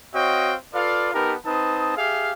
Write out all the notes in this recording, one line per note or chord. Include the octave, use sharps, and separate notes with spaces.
C4 F#4 C#5 D#5 F5 G5
F4 A4 B4 D5 F5
B3 D#4 G4 A#4 B4 A5
C4 D#4 B4 A5 D#6
G4 G#4 E5 F5